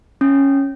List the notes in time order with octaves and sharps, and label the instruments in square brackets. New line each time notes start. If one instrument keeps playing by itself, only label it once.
[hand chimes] C#4